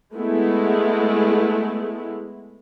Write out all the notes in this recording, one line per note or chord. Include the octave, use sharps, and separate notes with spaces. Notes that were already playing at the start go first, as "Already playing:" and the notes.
G#3 A3 B3 E4